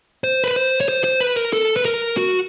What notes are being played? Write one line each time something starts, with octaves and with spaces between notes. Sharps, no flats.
C5
B4
C5
C#5
C5
C5
B4
A#4
A4
B4
A#4
F#4